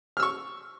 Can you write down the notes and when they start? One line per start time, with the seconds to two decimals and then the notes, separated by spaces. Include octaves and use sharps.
0.17 F6
0.20 E6
0.23 C#6